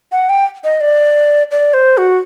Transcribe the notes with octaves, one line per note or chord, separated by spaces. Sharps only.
F#5
G5
D#5
D5
D5
C5
F#4